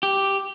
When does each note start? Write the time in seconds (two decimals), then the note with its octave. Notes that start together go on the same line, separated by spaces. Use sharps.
0.03 G4